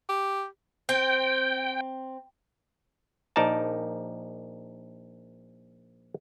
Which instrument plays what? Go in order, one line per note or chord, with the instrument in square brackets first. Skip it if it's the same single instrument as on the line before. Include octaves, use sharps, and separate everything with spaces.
[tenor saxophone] G4
[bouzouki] C4 [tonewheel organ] G5
[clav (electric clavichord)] A#1 D#4 A#4 D5 A5